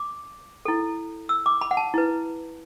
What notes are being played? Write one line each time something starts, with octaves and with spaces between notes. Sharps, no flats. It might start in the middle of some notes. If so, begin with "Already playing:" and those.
Already playing: D6
E4 A4
E6
D6
B5
F#5
A5
E4 B4